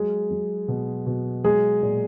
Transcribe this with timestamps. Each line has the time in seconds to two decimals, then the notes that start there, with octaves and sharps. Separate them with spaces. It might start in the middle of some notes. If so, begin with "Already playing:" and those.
Already playing: F#3 G#3 G#4
0.30 F#3
0.68 B2
1.06 B2
1.44 F#3 G#3 G#4
1.82 A#2